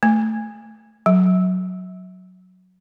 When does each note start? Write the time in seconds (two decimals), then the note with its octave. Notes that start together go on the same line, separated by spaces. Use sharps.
0.03 A3
1.06 F#3